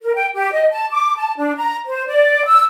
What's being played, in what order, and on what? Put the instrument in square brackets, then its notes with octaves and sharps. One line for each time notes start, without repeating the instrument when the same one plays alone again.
[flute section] A#4
G5
G4
D#5
A5
D6
A5
D4
A#5
C5
D5
E6